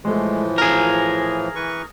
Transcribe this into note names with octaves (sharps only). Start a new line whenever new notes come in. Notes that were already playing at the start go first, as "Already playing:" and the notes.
A2 E3 F3 G#3 A3
F4 G#4 A#4
E3 B4 C#6